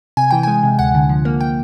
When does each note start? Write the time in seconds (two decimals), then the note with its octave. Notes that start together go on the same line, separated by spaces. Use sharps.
0.17 C3 G#5
0.31 E3 G5
0.43 G#3 G#5
0.63 C3
0.79 D2 F#5
0.95 D3
1.09 F3
1.25 A#3
1.40 G5